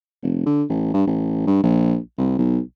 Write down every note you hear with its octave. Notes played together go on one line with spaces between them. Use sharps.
F1
D3
A1
G2
A1
G2
A#1
C2
B1